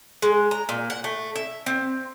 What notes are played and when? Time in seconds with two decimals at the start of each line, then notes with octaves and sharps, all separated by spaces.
0.22 G#3
0.51 A#5
0.69 A#2
0.90 F#5
1.04 A3
1.36 E5
1.66 C4